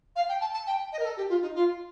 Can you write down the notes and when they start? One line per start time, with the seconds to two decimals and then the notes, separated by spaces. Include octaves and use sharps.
0.16 F5
0.29 G5
0.41 A5
0.53 A5
0.66 G5
0.92 D#5
0.99 A#4
1.05 A4
1.17 G4
1.29 F4
1.42 D#4
1.55 F4